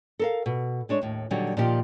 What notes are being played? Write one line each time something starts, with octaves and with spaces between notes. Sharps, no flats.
A4 A#4 F5
B2
G#3 D4 C#5
D#2 A2
A#2 D3 D#3 F#3 G3
A#2 D#3 F3 G4